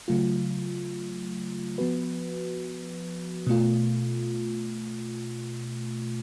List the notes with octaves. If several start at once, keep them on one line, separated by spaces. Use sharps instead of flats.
C#3 F#3 A3 F4
F3 B3 F#4 B4
B2 A3 F4